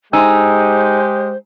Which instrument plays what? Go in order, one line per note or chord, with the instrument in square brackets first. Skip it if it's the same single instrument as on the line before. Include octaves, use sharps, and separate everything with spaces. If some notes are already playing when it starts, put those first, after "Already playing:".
[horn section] G#3 G4 [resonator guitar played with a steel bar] D#4 [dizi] C5 [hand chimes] G#5 E6